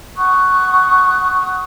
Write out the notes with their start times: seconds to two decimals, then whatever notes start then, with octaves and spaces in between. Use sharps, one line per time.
0.16 F#5 C#6 D#6 F#6